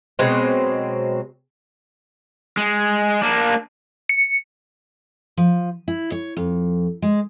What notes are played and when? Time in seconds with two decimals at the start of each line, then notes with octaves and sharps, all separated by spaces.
0.19 B2 F#3 G#3 C4
2.57 G#3
3.22 A#3 D4
4.09 C#7
5.37 F3
5.88 E4
6.12 C#5
6.37 F2
7.02 G#3